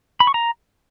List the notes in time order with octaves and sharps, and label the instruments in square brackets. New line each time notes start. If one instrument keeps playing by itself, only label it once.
[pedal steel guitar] B5
C#6
A#5